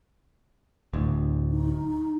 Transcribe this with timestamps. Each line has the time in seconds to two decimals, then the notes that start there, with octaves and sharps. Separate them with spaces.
0.93 D1 D2
1.52 D#4